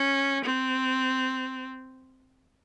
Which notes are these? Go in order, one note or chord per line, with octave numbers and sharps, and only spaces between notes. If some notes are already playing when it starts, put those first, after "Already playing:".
Already playing: C#4
C4